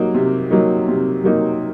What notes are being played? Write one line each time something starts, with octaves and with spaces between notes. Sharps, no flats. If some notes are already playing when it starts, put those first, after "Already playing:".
Already playing: F#3 A#3 D#4
C3
F#3 A#3 D#4
C3
F#3 A#3 D#4